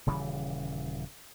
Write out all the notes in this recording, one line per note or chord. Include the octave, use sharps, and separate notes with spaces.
D#1 C#3 E3 G3